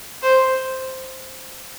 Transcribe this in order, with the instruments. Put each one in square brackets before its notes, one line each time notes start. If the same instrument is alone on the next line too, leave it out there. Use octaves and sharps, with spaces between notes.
[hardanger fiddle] C5